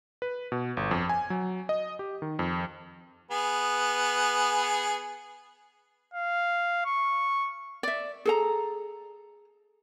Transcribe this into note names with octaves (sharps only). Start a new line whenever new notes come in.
B4
B2
G1
F2
G#5
F#3
D#5
G4
D#3
F2
B3 G#4
F5
C#6
D5 E5
G#4 A4 A#5